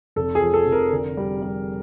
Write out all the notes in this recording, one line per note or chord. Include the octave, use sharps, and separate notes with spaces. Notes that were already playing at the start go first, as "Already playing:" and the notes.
F1 A4
G#4
F3
A4
F1
A#4
D3
G3
G3